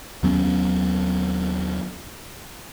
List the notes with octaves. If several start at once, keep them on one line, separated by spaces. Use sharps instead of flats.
D#2 F#3 B3 C#4